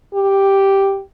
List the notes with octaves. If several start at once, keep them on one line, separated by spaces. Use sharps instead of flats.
G4